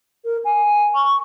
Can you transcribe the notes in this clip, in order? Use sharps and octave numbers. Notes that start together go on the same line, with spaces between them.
A#4
G#5
C#6